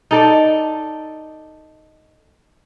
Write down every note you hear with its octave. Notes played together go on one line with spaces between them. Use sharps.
D#4 A4 D5